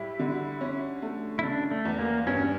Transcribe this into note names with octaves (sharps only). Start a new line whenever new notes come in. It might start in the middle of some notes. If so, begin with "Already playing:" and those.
Already playing: A2 G3 E4
D3
C#4
A3
E4
C#3 D4
A3
E2
A#3
G2 C#4